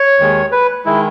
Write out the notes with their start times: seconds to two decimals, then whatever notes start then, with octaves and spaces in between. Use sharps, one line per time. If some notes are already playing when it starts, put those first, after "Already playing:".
Already playing: C#5
0.19 D#2 D#3 G#3
0.52 B4
0.85 D#3 G#3 E4